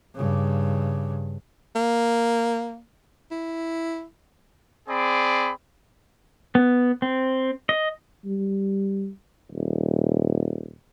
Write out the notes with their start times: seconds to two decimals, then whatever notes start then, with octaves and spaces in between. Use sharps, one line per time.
0.14 G2 C#3
1.75 A#3
3.31 E4
4.89 C4 G#4 D5 B5
6.55 B3
7.02 C4
7.69 D#5
8.25 G3
9.52 D#1